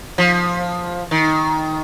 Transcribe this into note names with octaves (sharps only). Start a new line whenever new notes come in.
F3
D#3